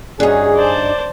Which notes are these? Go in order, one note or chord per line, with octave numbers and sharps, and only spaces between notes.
G2 C#4 D#4 F#4 G#4
C5 D5 A5